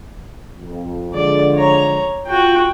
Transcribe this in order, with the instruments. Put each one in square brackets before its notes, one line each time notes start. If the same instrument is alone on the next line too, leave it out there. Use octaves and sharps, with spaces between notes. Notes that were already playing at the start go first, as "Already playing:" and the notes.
[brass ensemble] F2
[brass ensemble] D3 F3 G#3 [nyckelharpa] D5
[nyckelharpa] C#5 A#5
[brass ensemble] F4 [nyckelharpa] F#4 G5